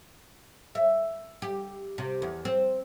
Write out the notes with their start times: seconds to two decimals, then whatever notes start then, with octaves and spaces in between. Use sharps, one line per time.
0.75 E5
1.42 G4
1.98 C3
2.22 E2
2.45 C4